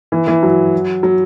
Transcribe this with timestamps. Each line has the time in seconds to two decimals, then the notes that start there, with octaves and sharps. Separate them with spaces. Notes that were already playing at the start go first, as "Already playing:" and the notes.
0.12 E3
0.27 E3
0.43 F#3
1.03 F#3